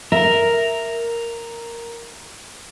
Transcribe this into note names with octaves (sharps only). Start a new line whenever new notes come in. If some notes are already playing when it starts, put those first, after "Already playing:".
A#4 E5